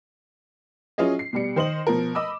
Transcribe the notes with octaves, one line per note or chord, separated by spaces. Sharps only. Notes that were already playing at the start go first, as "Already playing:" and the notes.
F#3 C#4 E4 F4 G#4 D#5
C7
B2 G3 C#7
D#3 C5 D#5 F#7
B2 F3 A#4
D#5 B5 D6 E6